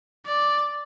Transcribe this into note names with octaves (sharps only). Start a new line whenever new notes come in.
D5